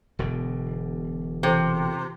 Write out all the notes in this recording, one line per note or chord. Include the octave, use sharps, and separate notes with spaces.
E1 B2 D3
C3 E3 F4 A4 C5 G5